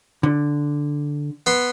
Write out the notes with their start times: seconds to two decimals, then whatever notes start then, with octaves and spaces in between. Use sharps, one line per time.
0.23 D3
1.46 B3 B5 C6